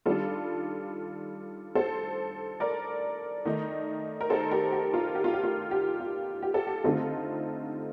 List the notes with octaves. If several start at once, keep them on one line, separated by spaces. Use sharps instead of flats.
D#3 G3 D4 F4 A4
A4 C5
A#4 D5
D#3 A3 D#4
A#4
A4 C5
G4 A#4
G4
F4
G4
F4
G4
F4
G4
F4
G4
A4
G4
D3 A3 C4 D#4 F4 A4